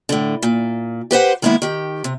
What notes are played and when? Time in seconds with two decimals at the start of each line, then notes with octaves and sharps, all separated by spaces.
0.09 A2 D3
0.43 A#2
1.11 G4 B4 C5 F#5
1.42 D#3 G#3 A#3 B3 E4
1.62 D#3 G4
2.04 C3